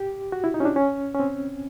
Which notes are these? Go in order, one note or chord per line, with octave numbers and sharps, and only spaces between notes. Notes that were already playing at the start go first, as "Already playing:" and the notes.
Already playing: G4
F#4
E4
D#4
C#4
D4
C#4
C#4
C4